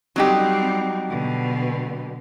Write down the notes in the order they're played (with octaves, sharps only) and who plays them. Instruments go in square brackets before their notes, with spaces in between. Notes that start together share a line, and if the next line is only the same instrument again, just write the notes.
[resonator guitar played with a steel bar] F#3 D#4 G4 [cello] G3 C4
[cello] B2 D3